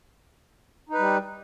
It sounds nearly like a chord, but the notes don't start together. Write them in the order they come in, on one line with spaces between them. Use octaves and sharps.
D#4 B4 G3